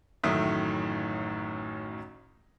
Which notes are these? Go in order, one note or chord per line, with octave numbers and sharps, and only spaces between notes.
A1 F#2 A2 D#3 E5 D#6